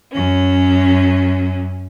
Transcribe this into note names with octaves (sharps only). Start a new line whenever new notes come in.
F#2 C#4